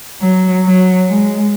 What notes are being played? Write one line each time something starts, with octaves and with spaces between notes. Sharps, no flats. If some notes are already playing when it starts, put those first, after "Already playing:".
F#3
F#3
G#3